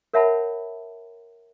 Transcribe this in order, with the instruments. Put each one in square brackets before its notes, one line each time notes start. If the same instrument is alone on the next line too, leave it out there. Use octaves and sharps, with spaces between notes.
[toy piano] A#4 C#5 E5 F#5 A5 B5